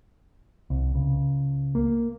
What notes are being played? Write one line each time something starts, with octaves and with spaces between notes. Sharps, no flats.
C2
C#2
A#3